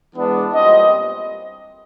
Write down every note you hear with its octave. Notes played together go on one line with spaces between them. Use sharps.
E3 G#3 B3 D4
A#2 G3 C4 D#5